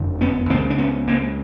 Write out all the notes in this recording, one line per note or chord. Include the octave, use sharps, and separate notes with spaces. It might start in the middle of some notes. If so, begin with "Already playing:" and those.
Already playing: F#1 F2 D3
B3 C#4
C#2 C#3 A#3 C4
D4
B3 C#4
A#3 C4